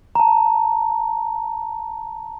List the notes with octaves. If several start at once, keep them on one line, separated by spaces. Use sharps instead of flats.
A5 A#5